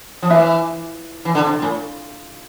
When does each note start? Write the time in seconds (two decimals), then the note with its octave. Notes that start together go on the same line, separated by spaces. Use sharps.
0.22 F3
0.30 E3 E4 B4 E5
1.25 E3
1.35 D3
1.46 C3
1.62 A2